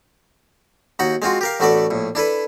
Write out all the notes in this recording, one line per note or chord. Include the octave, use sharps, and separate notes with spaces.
D#2 D#4 F#4 F#5
G#3 C4 F4 F#4
G4 A#4 F5
A1 A3 B3 F#4 A4 D5
A#1 A2
D4 E4 A4 B4